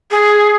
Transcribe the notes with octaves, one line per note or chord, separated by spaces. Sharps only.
G#4